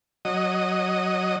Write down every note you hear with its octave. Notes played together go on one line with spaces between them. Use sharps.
F#3 D#5